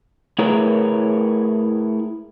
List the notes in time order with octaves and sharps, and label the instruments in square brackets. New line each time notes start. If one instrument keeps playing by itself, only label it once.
[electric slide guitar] A3 E4 G#4 A#4 B4 C#5